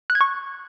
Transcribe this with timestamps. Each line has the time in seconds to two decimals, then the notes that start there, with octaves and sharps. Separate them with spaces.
0.10 F#6
0.15 G#6
0.21 C#6